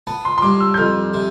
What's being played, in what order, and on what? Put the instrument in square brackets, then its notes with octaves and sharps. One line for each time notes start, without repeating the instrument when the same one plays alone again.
[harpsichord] B3 [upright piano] A5
[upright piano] C6
C6
[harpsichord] G2 [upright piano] D6
[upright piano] E6
G6
[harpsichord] F2 [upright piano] F6
[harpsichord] C3